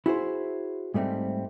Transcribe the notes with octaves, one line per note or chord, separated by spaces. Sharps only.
E4 F#4 G#4 C5
G#2 G3 A3 C4